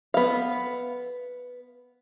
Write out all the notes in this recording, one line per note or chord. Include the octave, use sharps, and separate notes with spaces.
B3 F5